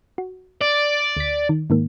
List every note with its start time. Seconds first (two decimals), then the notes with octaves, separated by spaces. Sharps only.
0.18 F#4
0.61 D5
1.17 D2 B6
1.49 D#3
1.70 G#2 D#3 A#3